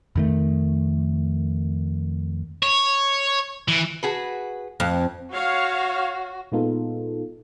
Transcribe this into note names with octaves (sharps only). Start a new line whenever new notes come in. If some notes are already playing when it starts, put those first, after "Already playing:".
F2 D#3 A3
C#5
E3
F#4 G#4 B4
F2
F#4 C#5 F5
A#2 G#3 B3 D#4 F4 A4